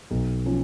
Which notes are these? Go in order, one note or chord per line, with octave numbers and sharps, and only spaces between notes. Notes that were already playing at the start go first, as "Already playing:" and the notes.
B1
F3 C#4